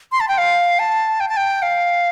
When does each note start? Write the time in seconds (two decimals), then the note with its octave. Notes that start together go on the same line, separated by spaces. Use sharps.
0.12 C6
0.20 A5
0.28 G5
0.38 F5
0.79 A5
1.20 G5
1.29 A5
1.37 G5
1.62 F5